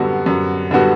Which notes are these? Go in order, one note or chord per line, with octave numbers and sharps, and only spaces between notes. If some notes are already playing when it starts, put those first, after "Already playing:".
Already playing: F#2 D3 G3 B3 F#4
F#2
D3 G3 B3 F#4